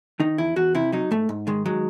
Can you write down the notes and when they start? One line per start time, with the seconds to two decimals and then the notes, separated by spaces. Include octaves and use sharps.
0.20 D#3 D#4
0.38 E2 E4
0.56 E2 F#4
0.75 C3 E4
0.92 F#3 D#4
1.11 G#2 A3
1.29 G#2
1.47 D#3 G#3
1.66 F#3 G#3